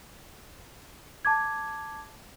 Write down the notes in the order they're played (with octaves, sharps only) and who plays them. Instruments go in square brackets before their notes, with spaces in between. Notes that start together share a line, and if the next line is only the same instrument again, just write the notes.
[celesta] A5 D6 G#6